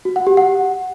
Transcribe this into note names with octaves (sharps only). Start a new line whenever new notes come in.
F#4
F#5
G4
F#5